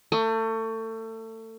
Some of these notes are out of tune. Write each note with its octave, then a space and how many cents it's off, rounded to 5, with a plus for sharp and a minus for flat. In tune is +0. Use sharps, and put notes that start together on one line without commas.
A3 +30